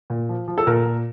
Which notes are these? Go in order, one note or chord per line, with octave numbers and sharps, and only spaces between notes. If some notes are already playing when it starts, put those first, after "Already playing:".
A#2
F3
F3
A4
A#2 A#4
A#2